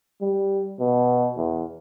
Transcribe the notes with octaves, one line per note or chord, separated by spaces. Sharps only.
G3
B2
E2